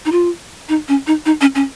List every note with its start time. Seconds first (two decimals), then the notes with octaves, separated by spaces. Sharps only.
0.05 D#4
0.12 F4
0.69 D#4
0.89 C#4
1.07 D#4
1.26 D#4
1.41 C#4
1.55 C#4